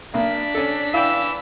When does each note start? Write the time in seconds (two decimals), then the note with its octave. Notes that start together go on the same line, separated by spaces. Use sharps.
0.14 B1 A#3 D4 B6
0.55 C#4 A4
0.94 E3 E4 F5 G5 E6